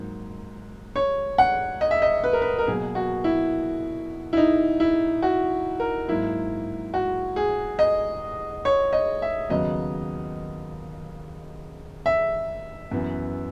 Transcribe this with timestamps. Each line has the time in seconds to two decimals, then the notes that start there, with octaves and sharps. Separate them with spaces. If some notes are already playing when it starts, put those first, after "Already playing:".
Already playing: G#2 F#3 A#3
0.96 C#5
1.38 F#5
1.81 D#5
1.91 E5
2.02 D#5
2.24 B4
2.33 A#4
2.42 B4
2.59 A#4
2.67 B2 F#3 A#3 G#4
2.95 F#4
3.24 E4
4.33 E4
4.37 D#4
4.80 E4
5.23 F#4
5.80 A#4
6.08 G#2 F#3 A#3 E4
6.94 F#4
7.36 G#4
7.79 D#5
8.65 C#5
8.93 D#5
9.22 E5
9.49 D#2 C#3 F#3 B3 D#5
12.06 E5
12.92 F#2 E3 B3